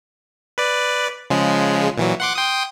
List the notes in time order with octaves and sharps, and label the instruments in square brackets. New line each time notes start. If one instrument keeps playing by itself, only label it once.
[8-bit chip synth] B4 D5
C#3 F3 G#3
A#2 E3 F#3
F#5 C6 D6
G5 C6 D#6